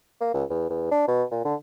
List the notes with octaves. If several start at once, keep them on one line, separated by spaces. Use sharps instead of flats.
A#3
C#2
E2
E2
D4
B2
A#2
D3